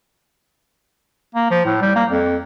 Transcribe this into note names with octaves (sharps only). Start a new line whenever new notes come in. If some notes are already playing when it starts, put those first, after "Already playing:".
A#3
F3
A2
G3
A#3
F2